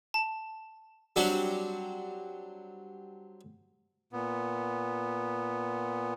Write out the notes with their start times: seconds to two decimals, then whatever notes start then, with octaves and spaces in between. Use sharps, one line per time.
0.14 A5
1.16 F#3 G3 C4 D4 F#4 G4
4.13 A#2 B3